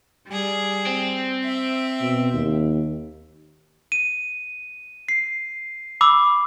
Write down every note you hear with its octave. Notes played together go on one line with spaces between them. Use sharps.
G3 G#4
C4
E5
B2
D#2
D#7
C7
B5 D6 E6